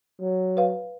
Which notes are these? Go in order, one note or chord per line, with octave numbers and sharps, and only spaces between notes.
F#3
B4 F5